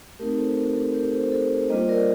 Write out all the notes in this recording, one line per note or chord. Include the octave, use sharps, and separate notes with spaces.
A3 C4 D#4 G4 A#4
A4 C5
G4 A#4
A4
G4 A#4
A4 C5
A4 C5
G3 A#3 D4 F4 C5 D#5
A#4 D5